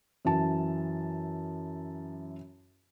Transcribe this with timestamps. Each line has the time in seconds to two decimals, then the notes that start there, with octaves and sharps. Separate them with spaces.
0.25 F#2 E3 A5